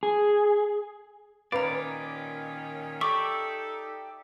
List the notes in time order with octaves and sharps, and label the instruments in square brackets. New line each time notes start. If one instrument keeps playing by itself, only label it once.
[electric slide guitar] G#4
[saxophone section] A#2 D#3 C#4 [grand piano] B4 [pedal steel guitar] D5 [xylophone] F5 A#5
[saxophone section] D#4 A4 [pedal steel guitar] G4 D5 E5 [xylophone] C#6 D6